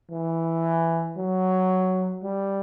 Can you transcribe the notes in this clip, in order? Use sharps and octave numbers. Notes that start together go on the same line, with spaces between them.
E3
F#3
G3